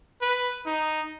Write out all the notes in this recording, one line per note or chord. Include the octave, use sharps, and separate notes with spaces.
B4
D#4